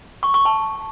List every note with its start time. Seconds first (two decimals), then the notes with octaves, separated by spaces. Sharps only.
0.23 C#6
0.34 C#6
0.45 A5